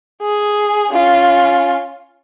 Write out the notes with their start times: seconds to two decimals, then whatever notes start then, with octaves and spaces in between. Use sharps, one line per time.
0.21 G#4
0.91 C#4 F4